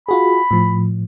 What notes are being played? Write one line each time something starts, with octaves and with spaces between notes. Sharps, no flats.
F4 F#4 G#4 B5
A2 F3